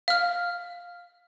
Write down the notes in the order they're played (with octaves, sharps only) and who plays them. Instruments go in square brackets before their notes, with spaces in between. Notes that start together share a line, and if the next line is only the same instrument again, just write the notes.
[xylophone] F5 F6